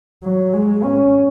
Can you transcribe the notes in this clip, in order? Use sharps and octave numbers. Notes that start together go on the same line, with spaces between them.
F#3
G#3
C#4